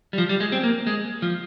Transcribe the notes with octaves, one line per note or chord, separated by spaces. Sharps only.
G3
F3
G3
G#3
C4
A#3
G#3
F3